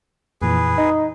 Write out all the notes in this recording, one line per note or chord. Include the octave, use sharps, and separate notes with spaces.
F2 A#2 E3 G#4 B4
D#4 D#5